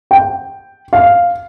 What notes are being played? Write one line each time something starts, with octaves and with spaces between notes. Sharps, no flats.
G5
F5